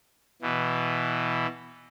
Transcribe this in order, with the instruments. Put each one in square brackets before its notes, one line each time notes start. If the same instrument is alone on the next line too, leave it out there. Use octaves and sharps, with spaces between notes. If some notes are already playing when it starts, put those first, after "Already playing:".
[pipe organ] B2 E3